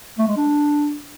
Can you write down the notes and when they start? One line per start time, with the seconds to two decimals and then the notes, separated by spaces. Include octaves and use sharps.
0.18 A3
0.28 G#3
0.37 D4